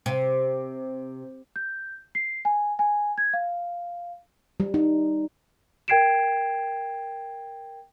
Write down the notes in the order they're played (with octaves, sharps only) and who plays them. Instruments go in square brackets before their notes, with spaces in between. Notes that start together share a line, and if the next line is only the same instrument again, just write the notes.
[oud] C3
[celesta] G6
C7
G#5
G#5
G#6
F5
[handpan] G3
D#4
[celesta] A#4 G5 G#6 C7 D7 E7